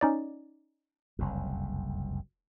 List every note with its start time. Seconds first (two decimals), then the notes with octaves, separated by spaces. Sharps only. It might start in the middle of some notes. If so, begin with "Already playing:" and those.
0.01 C#4 D#4 D5
1.19 F#1 C2 F2